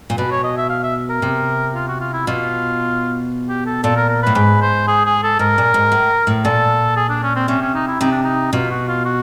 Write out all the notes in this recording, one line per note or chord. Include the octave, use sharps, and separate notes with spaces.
A#2
B2 B4
C#5
D#5
E5
F5
E5
A#4
C3
F4
F#4
F4
E4
B2 F4
G4
A4
A#2 A4
A#4
A#4
B4
A2
G#2 B4
C5
G#4
G#4
A4
G#2 A#4
A#2
G#2
A2
A2
A#2 A4
G#4
D4
C#4
C4
C3 C#4
C#4
D#4
E4
C3 D#4
D4
D#4
B2 F4
F#4
F4
F#4